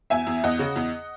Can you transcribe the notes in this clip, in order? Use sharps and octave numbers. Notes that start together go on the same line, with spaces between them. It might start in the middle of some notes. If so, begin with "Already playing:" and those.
E2 E5 G#5
E2
E2 D#5 F#5
C#3
E2